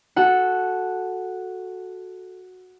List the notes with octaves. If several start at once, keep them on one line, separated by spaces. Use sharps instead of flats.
F#4 A4 F#5